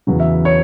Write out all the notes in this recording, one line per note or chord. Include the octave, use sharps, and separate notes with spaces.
E2 C#3 F#3
E5
C#5